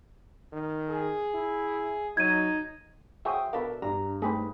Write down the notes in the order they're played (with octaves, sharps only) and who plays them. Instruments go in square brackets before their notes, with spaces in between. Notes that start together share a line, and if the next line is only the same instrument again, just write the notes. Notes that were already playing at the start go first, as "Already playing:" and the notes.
[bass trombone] D#3
[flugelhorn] G#4
[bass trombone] E4
[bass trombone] F#3 [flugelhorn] D#4 [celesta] G#6 D#7
[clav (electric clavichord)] F#4 G#4 C#5 [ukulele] C5 [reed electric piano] E5 G5 D#6
[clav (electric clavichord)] B2 F5 [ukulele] D4 A4 E5 [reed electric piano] A#4
[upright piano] G2 [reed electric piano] D4 [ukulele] A#5
[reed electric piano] A3 [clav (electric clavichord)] C4 G4 G#4 [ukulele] D#4 B4